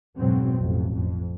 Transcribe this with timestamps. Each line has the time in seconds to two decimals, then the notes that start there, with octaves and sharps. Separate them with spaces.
0.17 F2 G#2 B2 F#3 C4
0.56 A1 F2
0.95 F2